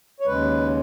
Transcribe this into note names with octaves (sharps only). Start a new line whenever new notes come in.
C#5
D#2 C#3 G#3 B4